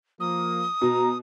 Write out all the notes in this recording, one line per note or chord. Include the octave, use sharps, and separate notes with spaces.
F3 A#3 D#6
B2 A#5